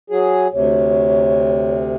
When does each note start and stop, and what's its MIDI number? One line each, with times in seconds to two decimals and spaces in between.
0.10 0.47 54
0.10 0.47 68
0.53 1.97 38
0.53 1.97 48
0.53 1.77 73